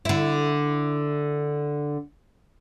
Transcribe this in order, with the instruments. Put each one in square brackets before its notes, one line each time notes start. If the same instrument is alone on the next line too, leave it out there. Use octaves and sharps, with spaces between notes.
[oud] D3 E4